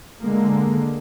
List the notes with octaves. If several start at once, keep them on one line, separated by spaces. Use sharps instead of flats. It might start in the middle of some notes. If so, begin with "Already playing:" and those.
D3 G#3 A#3